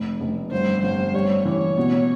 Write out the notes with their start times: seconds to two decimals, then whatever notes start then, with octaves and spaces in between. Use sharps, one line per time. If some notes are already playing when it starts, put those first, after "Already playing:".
Already playing: F1
0.21 F1
0.51 G1 C5
0.83 G1 C5
1.14 G3 C#5
1.45 E3 C#5
1.77 B2